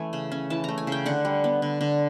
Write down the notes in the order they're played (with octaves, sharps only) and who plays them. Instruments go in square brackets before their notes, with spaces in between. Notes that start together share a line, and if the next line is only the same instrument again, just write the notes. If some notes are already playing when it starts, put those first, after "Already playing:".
Already playing: [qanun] E3 A3 C#4 G#5
C#3
C#4
E3 A5
A3 A#5
G#5
C#3 G5
D3 F#5
G3
B3
D3
D3